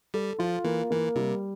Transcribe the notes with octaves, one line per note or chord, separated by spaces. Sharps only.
G3 A4
F3 F4
E3 A#3
E3 A#3
C3 G3